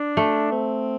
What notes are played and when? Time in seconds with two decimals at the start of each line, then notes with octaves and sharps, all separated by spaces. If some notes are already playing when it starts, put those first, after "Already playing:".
Already playing: D4
0.17 A3
0.52 C4